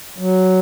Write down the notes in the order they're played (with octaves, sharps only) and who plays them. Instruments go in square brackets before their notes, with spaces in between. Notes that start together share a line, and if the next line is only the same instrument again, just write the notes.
[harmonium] F#3